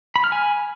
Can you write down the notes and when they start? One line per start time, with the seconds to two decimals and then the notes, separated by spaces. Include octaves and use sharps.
0.16 B5
0.24 F6
0.32 G#5